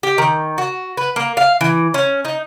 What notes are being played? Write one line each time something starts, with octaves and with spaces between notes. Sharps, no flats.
G4
D#3
F#4
B4
A#3
F5
E3
C#4
D#4